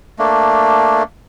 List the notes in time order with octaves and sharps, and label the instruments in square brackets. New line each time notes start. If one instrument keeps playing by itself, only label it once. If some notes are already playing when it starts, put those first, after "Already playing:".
[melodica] A3 A#3 D4